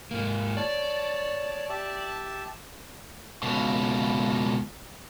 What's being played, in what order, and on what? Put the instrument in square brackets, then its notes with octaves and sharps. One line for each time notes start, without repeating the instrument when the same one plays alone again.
[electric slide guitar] G#2 A#3
[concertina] C#5 A5 [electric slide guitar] D5
[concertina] G4 E5 A5
[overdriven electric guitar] C#2 B2